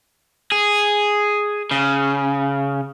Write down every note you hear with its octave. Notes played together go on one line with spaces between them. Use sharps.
G#4
C#3